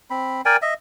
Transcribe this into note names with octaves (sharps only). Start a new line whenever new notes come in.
C4 B5
A#4 D5 G5 G#5
D#5 E5